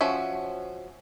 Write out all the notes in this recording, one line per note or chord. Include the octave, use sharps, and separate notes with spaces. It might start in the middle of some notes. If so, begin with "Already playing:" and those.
F3 C#4 F#4 E5